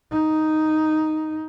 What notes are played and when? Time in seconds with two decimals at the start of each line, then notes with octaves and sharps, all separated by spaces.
0.12 D#4